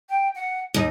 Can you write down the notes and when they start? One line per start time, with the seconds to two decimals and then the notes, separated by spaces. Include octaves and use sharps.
0.09 G5
0.35 F#5
0.74 D#2 D#4